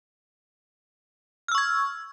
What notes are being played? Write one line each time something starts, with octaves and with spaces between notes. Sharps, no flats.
C#6 E6 F6 G#6